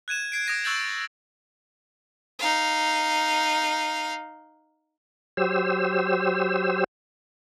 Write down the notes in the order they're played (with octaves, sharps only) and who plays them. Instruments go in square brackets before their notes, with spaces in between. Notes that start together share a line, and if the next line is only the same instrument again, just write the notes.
[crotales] F#6 G#6 D#7 E7
G#6 C7 D7
D#6 G#6 A#6 D7 D#7
C#6 E6 F#6 G6 A6 F#7
[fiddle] D#4 F5
[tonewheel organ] F#3 G4 C5 E6